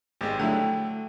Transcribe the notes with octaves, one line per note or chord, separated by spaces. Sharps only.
G#1 G#3 G4
D3 F#3 A3 E4 G5